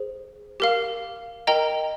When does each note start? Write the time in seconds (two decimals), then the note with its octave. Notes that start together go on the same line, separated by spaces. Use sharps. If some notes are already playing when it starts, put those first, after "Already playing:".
Already playing: G#4 C5
0.60 G4 A#4 F5
1.47 A#4 D#5 G5 A#5